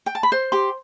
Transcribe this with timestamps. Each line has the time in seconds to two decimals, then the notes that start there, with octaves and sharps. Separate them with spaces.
0.06 G5
0.15 A5
0.23 B5
0.32 C5 C6
0.52 G4 C6